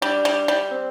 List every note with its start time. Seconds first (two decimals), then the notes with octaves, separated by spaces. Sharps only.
0.02 G3 D4
0.25 G3
0.48 G3
0.71 C4